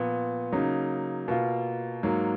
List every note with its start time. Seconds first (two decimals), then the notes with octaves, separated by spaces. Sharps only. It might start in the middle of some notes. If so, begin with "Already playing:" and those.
Already playing: A#2 F3 B3
0.52 C#3 F#3 A#3 D#4
1.28 B2 A#3 F4
2.03 G#2 F#3 A#3